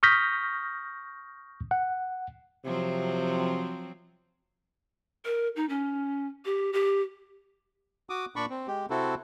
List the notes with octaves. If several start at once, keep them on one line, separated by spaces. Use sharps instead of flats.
C#6 D#6 F6 G6 A#6 B6
F#5
C3 F3 F#3 C4
A#4
D#4
C#4
G4
G4
F#4 D6 D#6
A#2 D4 D5 B5 C#6
C4
G#3 G4
C3 C4 E4 F#4 A4